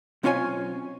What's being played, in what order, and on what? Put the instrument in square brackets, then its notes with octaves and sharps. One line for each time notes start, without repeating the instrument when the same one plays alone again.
[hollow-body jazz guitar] B1 C4 C#4 F4 C#5 G#5